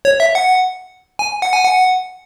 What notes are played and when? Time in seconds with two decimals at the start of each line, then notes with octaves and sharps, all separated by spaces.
0.05 C#5
0.20 E5
0.35 F#5
1.19 G#5
1.42 F#5
1.53 G#5
1.64 F#5